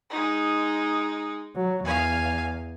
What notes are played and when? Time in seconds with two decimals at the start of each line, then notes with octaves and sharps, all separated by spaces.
0.10 G#3 D#4
1.55 F#3
1.84 E2 F5 G#5